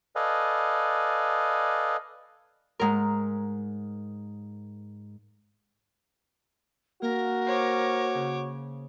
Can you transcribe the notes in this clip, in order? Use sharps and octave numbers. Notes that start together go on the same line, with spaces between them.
A4 B4 D5 D#5 F5 G#5
G#2 A#4
A#3 F#4 A#4
C5 C#5 D6
C#3